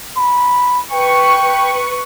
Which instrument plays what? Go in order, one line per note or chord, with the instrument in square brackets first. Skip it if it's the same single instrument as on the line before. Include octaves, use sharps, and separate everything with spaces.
[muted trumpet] B5
[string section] B4 C#6 [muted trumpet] G5